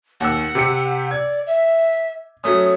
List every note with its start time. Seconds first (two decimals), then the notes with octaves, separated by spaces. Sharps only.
0.20 D#2 F#5 E6
0.55 C3 G4 C#7
1.11 D5 G#6
1.47 E5
2.44 F#3 A3 C#4 D#6